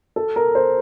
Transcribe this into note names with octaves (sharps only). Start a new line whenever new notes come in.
A4
A#4
C5